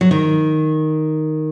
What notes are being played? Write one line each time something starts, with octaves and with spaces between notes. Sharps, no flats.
F#3
D#3